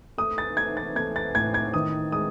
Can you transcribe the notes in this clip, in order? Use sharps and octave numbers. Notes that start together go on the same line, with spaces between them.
A3 D#6
A6
A3 G#6
A6
A3 G#6
A6
A2 G#6
G#6
D#3 D#6
G#3 D#6